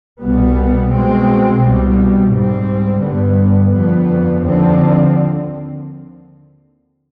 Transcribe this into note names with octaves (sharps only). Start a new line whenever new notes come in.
C2 B2 G3 B3
B2 G#3 C4
C2 B2 G3
G#2 G3 C4
G2 D3 G3 B3
F2 D3 F3 B3
D#2 D3 F3 C4